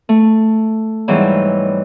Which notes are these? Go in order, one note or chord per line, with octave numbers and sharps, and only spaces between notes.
A3
G#2 B2 E3 F#3 G3